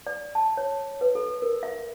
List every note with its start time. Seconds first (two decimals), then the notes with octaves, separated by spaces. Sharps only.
0.07 D5
0.35 A5
0.57 C#5
1.01 B4
1.15 A4
1.42 A#4
1.63 E5